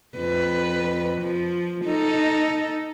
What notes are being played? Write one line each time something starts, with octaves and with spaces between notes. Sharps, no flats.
F2 B4
F3
D#4 A4